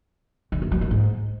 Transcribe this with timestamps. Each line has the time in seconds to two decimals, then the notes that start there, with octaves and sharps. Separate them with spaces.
0.52 D3
0.62 F#2
0.71 F#3
0.81 D#3
0.91 G#2